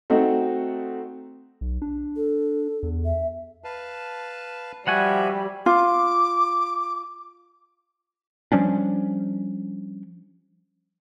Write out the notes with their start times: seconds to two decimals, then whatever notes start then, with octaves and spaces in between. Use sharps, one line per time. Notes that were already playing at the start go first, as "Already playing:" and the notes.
0.10 A3 C4 D#4 F#4
1.61 B1
1.82 D4
2.16 A4
2.83 E2
3.05 E5
3.64 B4 F5 A5
4.87 F3 G3 F#4 E5 F#5 G#5
5.66 F4 D6
8.52 F3 G3 C#4 D4